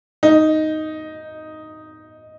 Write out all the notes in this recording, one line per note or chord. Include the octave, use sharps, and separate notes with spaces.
D#4